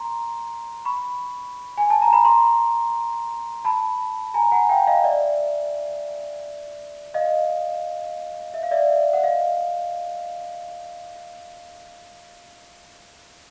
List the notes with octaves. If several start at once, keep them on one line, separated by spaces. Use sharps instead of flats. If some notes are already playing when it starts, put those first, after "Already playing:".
Already playing: A#5 C6
B5 C#6
G#5
A5
A#5
B5
A#5 C6
A5 B5
G#5 A#5
F#5 G#5
F5 G5
D#5 F5
D5 E5
D#5 F5
E5
F5
D5 E5
F#5
D#5 F5